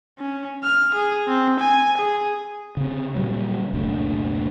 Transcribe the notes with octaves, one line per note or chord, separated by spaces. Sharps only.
C#4
F6
G#4
C4
G#5
G#4
C#3 C4
A#2 C#3 F#3 G3
F#1 D2 B2 D3